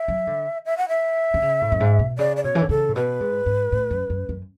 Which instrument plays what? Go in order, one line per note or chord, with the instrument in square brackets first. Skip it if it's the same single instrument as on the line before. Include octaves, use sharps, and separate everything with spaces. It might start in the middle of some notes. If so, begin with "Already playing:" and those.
Already playing: [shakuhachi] E5
[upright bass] F#3
D3
[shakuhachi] E5
F#5
E5
[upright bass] D3
C#3
A2
F#2
G#2
B2
[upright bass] C#3 [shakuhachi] D5
[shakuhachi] D5
[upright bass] B2 [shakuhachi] C#5
[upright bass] E3
D3
[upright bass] C#3 [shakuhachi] A4
[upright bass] A2
[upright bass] B2 [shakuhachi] B4
[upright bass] G#2
G#2
A2
F#2
F#2
F#2